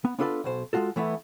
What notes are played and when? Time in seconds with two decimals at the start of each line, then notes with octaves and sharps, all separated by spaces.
0.05 B3
0.19 B3 D4 F4 A4 B4 D5
0.44 B1 B2 C5
0.73 G#3 A#3 F4 F#4 A4
0.96 E3 A3 B3 E4